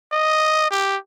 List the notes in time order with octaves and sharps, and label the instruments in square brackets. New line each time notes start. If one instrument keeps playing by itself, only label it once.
[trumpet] D#5
G4